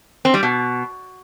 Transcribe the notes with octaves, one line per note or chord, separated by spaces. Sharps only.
C4
G3
B2